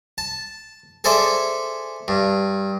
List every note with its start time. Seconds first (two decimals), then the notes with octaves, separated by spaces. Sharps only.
0.18 A5
1.04 G#4 A4 C5 D5 E5
2.08 G2